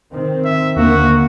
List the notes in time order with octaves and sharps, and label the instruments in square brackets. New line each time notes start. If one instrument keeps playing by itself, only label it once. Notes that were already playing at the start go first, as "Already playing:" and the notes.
[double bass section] D#3 C4
[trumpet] E5
[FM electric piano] D#2 D3 [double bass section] A#3 [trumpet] F#4